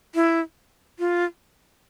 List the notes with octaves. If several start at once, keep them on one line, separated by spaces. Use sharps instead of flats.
E4
F4